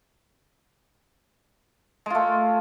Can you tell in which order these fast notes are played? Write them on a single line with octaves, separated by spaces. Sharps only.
G#3 F4 A3